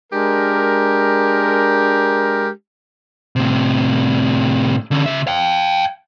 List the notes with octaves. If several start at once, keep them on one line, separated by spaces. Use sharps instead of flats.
G#3 D4 G4 A#4
A2 C3
D3 C#4
C#3 E5
F5 G5